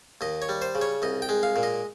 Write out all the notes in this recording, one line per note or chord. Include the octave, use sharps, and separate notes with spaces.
D#2 D#5
C#5
G3
C5
C#3
C#5
C2 D#5
G5
G#3
F5
A#2
D#5